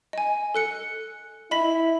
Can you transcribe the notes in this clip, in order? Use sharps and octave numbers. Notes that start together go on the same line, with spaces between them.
D#5 G#5
A4 F#6 C#7
E4 D#5 B5 B6